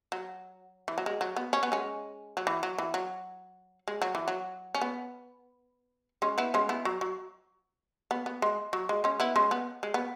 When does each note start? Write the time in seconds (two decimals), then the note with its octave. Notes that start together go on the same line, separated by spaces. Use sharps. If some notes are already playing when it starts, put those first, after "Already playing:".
0.12 F#3
0.88 E3
0.98 F#3
1.06 G#3
1.21 F#3
1.36 B3
1.53 C#4
1.63 B3
1.72 G#3 C#4
2.37 F#3
2.47 E3
2.63 F#3
2.78 E3
2.94 F#3
3.88 G#3
4.02 F#3
4.15 E3
4.28 F#3
4.75 C#4
4.81 B3
6.22 G#3 C#4
6.38 B3 E4
6.54 G#3 C#4
6.69 B3 E4
6.85 F#3
7.01 F#3
8.11 B3
8.26 B3
8.42 G#3
8.73 F#3
8.89 G#3
9.04 G#3 C#4
9.20 B3 E4
9.36 G#3 C#4
9.51 B3
9.83 G#3
9.94 B3